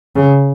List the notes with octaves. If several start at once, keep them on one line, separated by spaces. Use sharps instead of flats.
C#3